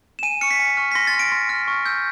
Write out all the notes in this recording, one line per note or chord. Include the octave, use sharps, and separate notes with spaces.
E7
G#5 D#7
C#6 F6 C#7
B6
G#5
C#6 F6
B6
C6 A#6
A6
F6
D7
C6
F6
C#6
E6 G6